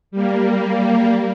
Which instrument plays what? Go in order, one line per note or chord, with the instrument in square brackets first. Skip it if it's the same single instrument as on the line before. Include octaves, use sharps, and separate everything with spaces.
[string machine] G3 A#3